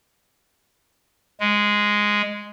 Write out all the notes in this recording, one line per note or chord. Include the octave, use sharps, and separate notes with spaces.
G#3